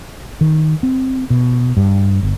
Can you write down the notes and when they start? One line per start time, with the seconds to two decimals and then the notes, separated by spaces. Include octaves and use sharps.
0.41 D#3
0.83 C4
1.30 B2
1.77 G2
2.23 G1